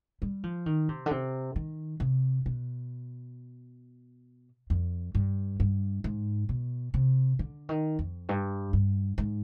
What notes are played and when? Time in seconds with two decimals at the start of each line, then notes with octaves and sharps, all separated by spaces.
0.22 G3
0.44 F3
0.66 D#3
0.89 C3
1.06 D3
1.11 C3
1.56 D#3
2.00 C3
2.46 B2
4.70 F2
5.15 G2
5.60 G2
6.04 G#2
6.49 B2
6.94 C3
7.39 D3
7.69 D#3
7.99 F2
8.29 G2
8.73 G2
9.18 G#2